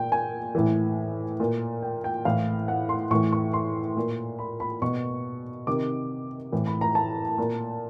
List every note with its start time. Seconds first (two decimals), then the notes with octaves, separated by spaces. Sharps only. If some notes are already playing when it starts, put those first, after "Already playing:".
Already playing: A#2 G5
0.12 G#5
0.55 A2 E3
1.40 A#2
1.82 G5
2.04 G5
2.25 A2 E3 F5
2.68 F#5
2.89 C6
3.11 A2 E3 C#6
3.33 C#6
3.53 C6
3.97 A#2
4.39 B5
4.60 B5
4.82 B2 C#6
5.67 C3 D#3 D6
6.52 A2 E3
6.67 B5
6.81 A#5
6.95 A5
7.38 A#2